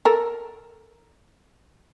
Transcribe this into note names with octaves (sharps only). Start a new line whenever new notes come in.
A4 A#4